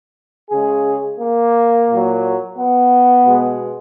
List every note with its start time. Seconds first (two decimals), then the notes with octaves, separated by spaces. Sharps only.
0.51 C#3 G#3 G#4
1.19 A#3
1.88 A#2 F#3
2.57 B3
3.24 B2 G#3